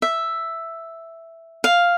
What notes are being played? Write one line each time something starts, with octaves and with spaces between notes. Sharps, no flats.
E5
F5